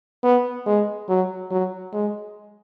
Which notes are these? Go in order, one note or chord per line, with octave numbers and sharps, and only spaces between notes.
B3
G#3
F#3
F#3
G#3